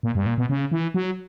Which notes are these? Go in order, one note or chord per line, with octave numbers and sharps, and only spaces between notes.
A#2
G2
A#2
B2
C#3
E3
F#3